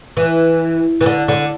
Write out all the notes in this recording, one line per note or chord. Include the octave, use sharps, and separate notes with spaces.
E3
E3
D3
D3